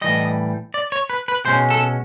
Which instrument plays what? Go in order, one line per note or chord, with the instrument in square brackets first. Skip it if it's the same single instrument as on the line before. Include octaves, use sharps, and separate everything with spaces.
[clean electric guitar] A2 E3 G3 D#5
D5
C#5
B4
B4
B2 G#3 C#4 C5
A4